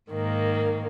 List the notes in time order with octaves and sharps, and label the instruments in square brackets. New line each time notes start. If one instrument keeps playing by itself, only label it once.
[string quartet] G#2 D#3 A#3